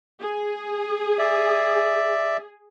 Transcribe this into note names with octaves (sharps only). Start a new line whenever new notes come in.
G#4
D5 E5